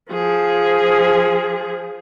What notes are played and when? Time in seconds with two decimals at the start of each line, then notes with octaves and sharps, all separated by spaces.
0.11 F3 G#4